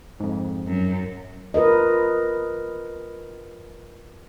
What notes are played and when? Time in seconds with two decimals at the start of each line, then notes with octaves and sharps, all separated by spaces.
0.20 F2 G#2
0.66 F#2
1.54 F4 A#4 B4 D#5